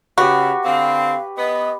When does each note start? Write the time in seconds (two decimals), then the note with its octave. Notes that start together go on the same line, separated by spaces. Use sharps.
0.18 C#3 F#4 G4 B4
0.64 D3 C4 F5
1.38 B3 D#5